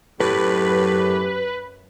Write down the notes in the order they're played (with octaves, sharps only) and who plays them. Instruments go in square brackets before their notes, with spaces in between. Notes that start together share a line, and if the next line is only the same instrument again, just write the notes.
[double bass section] F#2 [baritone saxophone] A2 [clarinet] G4 [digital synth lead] B4